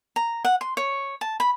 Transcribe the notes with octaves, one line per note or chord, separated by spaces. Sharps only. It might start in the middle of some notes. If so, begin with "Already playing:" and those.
A#5
F#5
C6
C#5
A5
B5